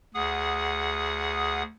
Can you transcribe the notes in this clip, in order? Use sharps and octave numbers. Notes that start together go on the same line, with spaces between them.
D2 G#4 F#5 D#6